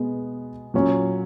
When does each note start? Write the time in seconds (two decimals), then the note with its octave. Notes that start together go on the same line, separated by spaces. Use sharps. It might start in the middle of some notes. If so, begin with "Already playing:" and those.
Already playing: B2 G#3 B3
0.74 A#2 F#3 C#4